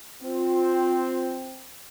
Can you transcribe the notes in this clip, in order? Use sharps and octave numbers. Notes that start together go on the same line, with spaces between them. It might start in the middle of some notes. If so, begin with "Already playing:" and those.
C4 F4